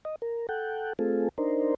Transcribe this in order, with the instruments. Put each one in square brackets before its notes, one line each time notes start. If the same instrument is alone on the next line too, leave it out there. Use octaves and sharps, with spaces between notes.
[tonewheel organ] D#5
A#4
A4 F#5 G5
A3 C4 F4 G#4 A4
D4 D#4 A#4 C5